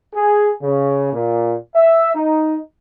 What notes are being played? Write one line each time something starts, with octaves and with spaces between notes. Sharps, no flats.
G#4
C#3
A#2
E5
D#4